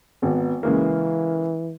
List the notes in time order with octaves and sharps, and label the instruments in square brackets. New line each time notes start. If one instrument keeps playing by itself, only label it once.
[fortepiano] G#1 [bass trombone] B3
[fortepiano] C#3 G#3 A#3 [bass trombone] E3